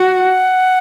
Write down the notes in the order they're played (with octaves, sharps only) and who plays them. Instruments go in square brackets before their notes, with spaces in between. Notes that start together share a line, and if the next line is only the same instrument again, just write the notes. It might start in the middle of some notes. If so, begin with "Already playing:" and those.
Already playing: [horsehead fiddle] F#4 [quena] F#5